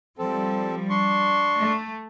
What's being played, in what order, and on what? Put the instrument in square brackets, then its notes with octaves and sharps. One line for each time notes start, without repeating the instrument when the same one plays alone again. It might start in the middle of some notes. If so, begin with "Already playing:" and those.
[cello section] F3 G3 [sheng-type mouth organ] C4 A4
[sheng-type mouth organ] D4 C6 C#6
[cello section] A3